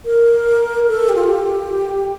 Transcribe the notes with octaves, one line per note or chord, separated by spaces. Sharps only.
A#4
A4
G4
F4
G4